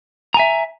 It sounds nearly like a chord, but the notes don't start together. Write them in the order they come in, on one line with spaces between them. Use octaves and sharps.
A#5 G#5 E5